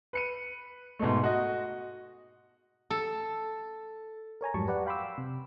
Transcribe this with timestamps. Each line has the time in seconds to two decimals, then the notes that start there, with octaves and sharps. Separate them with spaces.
0.13 B4 C#7 D#7
0.99 G#2 B2 G#3 A3
1.24 F#4 D#5
2.90 A4
4.41 A#4 C#5 G#5 A#5
4.54 F2 G#2 F#3 G3 A5 C#6
4.67 G4 B4 D5 F#5
4.86 F5 G5 B5 C6 D6 E6
5.18 C3